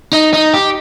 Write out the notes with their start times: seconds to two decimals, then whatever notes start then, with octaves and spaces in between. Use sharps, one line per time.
0.13 D#4
0.33 D#4
0.54 G4